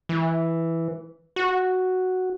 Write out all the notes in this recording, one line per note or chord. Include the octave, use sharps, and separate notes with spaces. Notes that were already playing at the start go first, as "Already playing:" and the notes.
E3
F#4